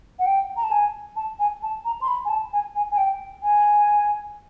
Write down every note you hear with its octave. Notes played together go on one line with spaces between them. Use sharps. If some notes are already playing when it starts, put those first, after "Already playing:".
F#5
G5
A#5
A5
G#5
A5
G#5
A5
A#5
C6
B5
G#5
A5
G#5
G#5
G#5
G5
G#5